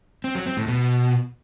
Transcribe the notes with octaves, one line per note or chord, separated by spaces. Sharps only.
C4
F#3
C4
A2
B2